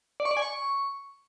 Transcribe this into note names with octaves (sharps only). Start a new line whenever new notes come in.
D5
C#6
D5
G#5
C#6